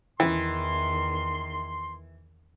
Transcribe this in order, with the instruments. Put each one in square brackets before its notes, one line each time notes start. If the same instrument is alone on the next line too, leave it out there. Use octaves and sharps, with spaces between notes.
[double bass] E2 D#3 [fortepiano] E3 [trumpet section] C6